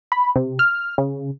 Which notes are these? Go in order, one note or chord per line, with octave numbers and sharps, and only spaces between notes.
B5
C3
F6
C#3